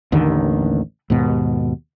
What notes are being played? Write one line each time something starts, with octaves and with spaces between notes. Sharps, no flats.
A1 D#2 D3 D#3
D#2 G#2 B2